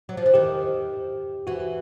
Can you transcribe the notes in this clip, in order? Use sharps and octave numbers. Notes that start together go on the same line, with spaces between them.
F#3
F3
E3
D#3 G4
E3 F#4
F#4